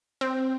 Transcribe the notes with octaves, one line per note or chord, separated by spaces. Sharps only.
C4